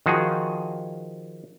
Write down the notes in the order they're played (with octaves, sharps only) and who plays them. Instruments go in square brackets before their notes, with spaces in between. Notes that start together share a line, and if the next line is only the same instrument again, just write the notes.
[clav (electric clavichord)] D#3 F3 F#4 G#4